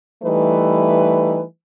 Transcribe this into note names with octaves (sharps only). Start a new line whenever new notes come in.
E3 G3 A3 D#4 B4